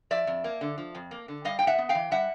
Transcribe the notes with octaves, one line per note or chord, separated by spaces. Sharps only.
F3 D5 E5
F2
A#3
D3
F3
F2
A#3
D3
G3 D#5 F5
G5
A2
E5 F#5
B3
F5 G5
E3
G3 E5 F#5